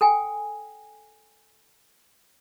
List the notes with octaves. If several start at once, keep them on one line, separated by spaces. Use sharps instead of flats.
A4 G5 G#5